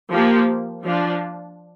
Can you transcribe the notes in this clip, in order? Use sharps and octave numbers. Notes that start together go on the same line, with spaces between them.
F3 A#3 G4
F3 D4 F4